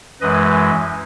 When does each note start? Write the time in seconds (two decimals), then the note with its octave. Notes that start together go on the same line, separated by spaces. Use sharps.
0.21 F#2 E3 G#3 B4 D#5